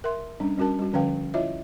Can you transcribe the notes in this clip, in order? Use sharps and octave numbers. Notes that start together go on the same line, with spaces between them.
A#4 E5 C6
G3 C#4 D4
G3 C#4 F#4 A#4 A5
G3 F#4
D3 F3 C#4 B4 F5 G5
E4 F4 C#5 D#5 E5